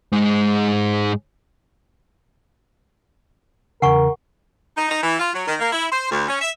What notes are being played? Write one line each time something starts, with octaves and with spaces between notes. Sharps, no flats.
G#2 G#3
E2 C#3 A#4 F#5 G#5 C#6
D#4
D#4
E3
F4
F#3
D#3
A#3
E4
C5
D2
C#4
E5